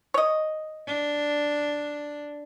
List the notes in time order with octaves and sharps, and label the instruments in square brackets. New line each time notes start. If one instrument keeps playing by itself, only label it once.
[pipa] C#5 D#5
[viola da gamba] D4